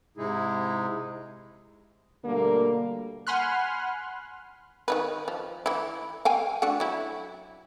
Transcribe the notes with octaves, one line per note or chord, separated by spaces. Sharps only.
G#2 C3 G#3 D#4 E4 G#4
B2 D3 G3 A3 A#3
F#5 G#5 B5 C6 F6 F#6
D#3 D#4 B4
F3
E3 E4
F5 G5 G#5
A3 D4 F#4
F#3 E4